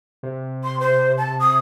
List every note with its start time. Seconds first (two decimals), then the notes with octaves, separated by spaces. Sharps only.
0.23 C3
0.64 C6
0.80 C5
1.18 A5
1.40 D#6